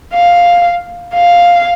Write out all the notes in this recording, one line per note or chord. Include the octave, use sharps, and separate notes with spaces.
F5
F5